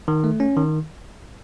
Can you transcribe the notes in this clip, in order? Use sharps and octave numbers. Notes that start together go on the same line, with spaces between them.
D#3
A3
C#4
D#3